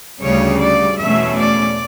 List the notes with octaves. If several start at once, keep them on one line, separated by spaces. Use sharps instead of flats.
D2 C#3 G3 C#5
D5
E2 B2 A3 C#4 E5
D5